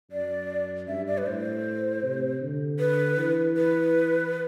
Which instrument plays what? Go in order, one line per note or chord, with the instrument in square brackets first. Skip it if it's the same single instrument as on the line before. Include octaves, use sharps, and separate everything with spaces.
[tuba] F#2 [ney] D5
[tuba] G2 [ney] E5
[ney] D5
B4
[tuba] A2 [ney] C5
[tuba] C3
D3
[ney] B4
[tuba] E3
[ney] B4